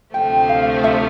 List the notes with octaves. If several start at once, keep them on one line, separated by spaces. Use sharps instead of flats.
D2 C3 F3 A3 G5
F5
E5